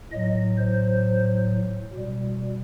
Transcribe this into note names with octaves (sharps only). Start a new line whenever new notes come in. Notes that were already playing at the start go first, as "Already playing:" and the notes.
A2 F#3 D#5
C5
B2 G3